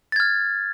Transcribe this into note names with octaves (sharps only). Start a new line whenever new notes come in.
F6 G#6 A6